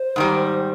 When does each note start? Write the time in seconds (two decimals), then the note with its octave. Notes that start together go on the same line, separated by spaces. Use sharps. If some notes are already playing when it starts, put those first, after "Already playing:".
Already playing: C5
0.16 G#2 D#3 G3